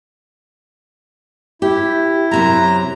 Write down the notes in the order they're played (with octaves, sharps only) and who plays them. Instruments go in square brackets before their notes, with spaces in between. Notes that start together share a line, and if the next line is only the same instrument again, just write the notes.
[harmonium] E4 [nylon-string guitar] G4
[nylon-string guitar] F#2 C3 F#3 [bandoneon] A#5